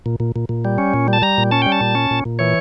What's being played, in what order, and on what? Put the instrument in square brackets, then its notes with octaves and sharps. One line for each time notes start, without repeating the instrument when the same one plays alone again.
[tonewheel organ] A#2
A#2
A#2
A#2
G3
C#4
A#2
G3
A5
G3 A#5
A#2
C#4 A5
G3 G5
A5
A#2
C#4
A#2
A#2
E3 C#5